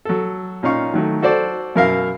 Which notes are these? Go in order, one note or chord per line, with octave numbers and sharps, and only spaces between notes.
F#3 A4
A#2 C#4 D#4 F5 C#6
D#3 F#3 A3
F#4 A4 C5 D5
F#2 B2 A#4 E5 F5